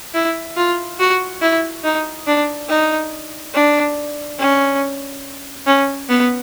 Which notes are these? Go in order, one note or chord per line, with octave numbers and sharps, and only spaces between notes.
E4
F4
F#4
E4
D#4
D4
D#4
D4
C#4
C#4
B3